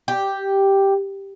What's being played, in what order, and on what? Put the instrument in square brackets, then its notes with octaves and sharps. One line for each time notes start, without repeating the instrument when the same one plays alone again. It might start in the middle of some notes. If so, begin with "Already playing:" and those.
[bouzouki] G4